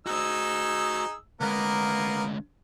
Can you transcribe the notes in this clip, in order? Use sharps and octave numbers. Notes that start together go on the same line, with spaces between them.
D#4 F#4 G#4 C5 E6
D2 G#3 A#3 B3 A#4